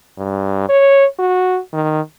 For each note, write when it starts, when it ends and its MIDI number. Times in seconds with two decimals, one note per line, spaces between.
0.18 0.66 43
0.69 1.05 73
1.19 1.60 66
1.73 2.01 51